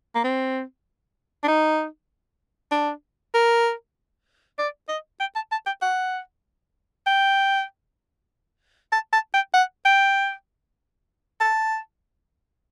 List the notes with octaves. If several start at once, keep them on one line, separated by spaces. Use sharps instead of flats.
A#3
C4
D4
D#4
D4
A#4
D5
D#5
G5
A5
A5
G5
F#5
G5
A5
A5
G5
F#5
G5
A5